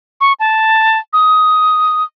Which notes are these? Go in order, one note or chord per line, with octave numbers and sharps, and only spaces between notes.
C#6
A5
D#6